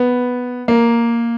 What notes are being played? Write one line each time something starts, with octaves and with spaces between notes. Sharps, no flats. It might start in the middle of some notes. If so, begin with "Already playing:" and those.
Already playing: B3
A#3